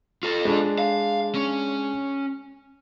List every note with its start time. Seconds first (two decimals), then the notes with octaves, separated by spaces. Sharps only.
0.23 F4 A4
0.45 G#3 D4
0.78 F5
1.35 C#4